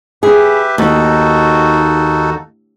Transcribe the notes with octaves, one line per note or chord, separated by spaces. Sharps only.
G4 G#4 B4 E5
D#2 D#4 F#4 A4